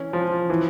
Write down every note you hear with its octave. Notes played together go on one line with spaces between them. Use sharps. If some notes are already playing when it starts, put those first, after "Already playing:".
Already playing: E3 C#4
F3
E3